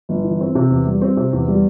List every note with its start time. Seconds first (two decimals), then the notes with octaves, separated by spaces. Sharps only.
0.09 G1
0.24 E3
0.41 C4
0.55 C3
0.70 E2
0.87 G3
1.02 C4
1.17 C3
1.33 E2
1.48 G3